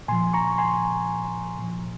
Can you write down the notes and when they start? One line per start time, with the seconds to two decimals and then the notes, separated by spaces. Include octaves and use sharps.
0.08 A#2 F3 G#5 C6
0.33 A#5 C#6
0.58 G#5 C6
1.58 A#2 F3